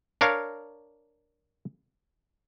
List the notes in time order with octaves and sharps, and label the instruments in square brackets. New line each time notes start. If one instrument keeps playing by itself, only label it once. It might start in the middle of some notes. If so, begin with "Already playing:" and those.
[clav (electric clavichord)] D4 A#4 C#5 F5